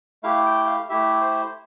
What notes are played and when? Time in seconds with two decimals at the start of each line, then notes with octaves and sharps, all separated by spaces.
0.23 A3 E4 G4 F5
0.46 G5
0.67 F5
0.89 A3 E4 G4 E5
1.21 C5